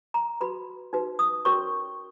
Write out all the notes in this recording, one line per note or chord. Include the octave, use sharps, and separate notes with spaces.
A#5
F#4 B4 B5
D#4 F#4 B4
D#6
C#4 F#4 A#4 C#5 C#6